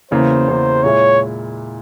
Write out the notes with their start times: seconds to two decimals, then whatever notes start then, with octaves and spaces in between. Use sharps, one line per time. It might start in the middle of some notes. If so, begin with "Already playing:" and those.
0.11 E2 C#3 E3 A#3 C5
0.47 E2 C#3 E3 A#3
0.84 A#2 G#3 E4 C#5